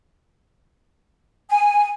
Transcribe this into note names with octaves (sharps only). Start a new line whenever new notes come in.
G#5